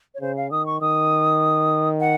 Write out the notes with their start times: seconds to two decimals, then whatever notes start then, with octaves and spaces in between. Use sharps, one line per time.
0.15 C#5
0.21 C#3 C5
0.36 F5
0.51 D#3 D#6
0.66 C#6
0.81 D#3 D#6
2.00 F#5